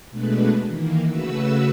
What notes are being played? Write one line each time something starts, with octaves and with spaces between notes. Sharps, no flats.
B2 G#3 A3 D4 B4
D#3 E3 A#3
C#3 A3 F#4 B4 E6